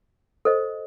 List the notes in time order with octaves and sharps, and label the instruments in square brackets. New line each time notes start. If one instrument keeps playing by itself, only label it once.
[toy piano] A4 C5 D#5